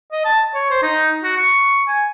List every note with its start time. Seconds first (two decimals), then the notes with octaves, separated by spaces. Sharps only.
0.12 D#5
0.25 A5
0.55 C#5
0.70 C5
0.83 D#4
1.24 F#4
1.37 C#6
1.88 G#5